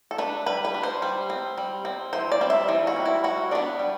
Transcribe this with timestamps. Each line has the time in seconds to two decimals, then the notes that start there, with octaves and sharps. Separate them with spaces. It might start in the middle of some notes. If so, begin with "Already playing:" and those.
0.11 A4
0.18 D4 B4
0.46 G3 B4
0.65 B4
0.74 D4
0.83 C5
1.02 G3
1.30 C4
1.58 G3
1.85 C4
2.13 E3 C5
2.32 D5
2.41 G3 C4
2.50 E5
2.68 E3 D5
2.87 F#4
2.96 G3 C4
3.05 E4
3.24 G3 F#4
3.51 B3 D4 D5
3.79 G3